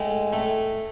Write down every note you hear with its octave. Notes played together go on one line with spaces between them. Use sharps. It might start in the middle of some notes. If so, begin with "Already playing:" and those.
Already playing: A2 G#3
A2 A3